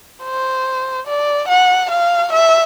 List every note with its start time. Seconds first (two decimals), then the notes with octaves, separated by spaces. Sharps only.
0.24 C5
1.07 D5
1.48 F#5
1.91 F5
2.33 E5